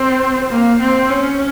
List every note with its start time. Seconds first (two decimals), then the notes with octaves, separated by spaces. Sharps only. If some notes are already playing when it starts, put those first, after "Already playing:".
Already playing: C4
0.50 A#3
0.80 C4
1.10 C#4